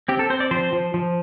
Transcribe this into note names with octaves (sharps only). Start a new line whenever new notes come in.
C4 G4
A4
C4 C5
D5
F3 C5
F3
F3